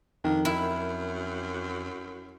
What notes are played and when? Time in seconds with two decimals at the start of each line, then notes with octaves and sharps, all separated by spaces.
0.24 F2 D#3 D4
0.45 F#2 E4